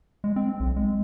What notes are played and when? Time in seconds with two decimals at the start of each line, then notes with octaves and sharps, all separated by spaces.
0.24 G#3
0.36 C4
0.60 B1
0.76 G#3